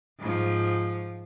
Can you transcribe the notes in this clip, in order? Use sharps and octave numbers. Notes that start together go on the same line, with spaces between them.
G#2 F3